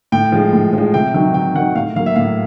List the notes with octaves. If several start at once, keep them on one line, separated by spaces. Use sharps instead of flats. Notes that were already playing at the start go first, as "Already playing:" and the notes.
A2 G5
F3 G#3
A2
F3 G#3
C3 G5
D#3 F#3 G5
C3 G5
D#3 F#3 F#5
A2 F5
F#3 A#3 F5
E5
A2 F5